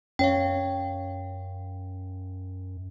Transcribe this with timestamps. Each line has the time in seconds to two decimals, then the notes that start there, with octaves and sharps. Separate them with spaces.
0.19 F#2 C#4 C#5 F5 G5